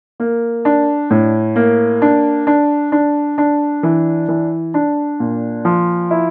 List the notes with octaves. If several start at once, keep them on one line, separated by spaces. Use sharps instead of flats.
A#3
D4
A2
A#3
D4
D4
D4
D4
E3
E3
D4
A#2
F3
E4